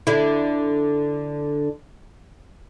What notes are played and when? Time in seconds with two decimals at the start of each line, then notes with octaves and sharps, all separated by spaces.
0.07 D3 E4